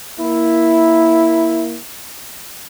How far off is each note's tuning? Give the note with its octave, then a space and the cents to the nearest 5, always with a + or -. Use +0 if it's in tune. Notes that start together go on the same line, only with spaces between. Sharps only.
A#3 +15 E4 +0